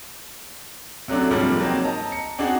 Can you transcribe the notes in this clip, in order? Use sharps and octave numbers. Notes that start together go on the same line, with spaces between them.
C3 F#3 A3 D4
G#2 C3 F3 G3 G#3 A#3
F#3 A#3 C4 D#4
D#5 A5 A#5
C#7
C4 D4 D#4 F#4 G#4